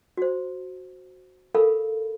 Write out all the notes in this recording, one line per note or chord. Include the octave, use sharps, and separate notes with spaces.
F#4 C5
A4 A#4 F5 B5